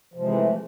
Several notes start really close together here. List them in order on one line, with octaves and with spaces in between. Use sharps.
F3 C3 G#3 E3 A3